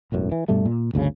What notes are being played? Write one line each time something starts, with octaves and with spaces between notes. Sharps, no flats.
E1 A1 F#2
E3
G2 B2 G3 A3
A#2
G1 D2 A#2 C#3